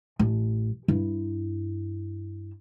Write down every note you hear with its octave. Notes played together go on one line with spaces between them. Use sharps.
A1
G2 E4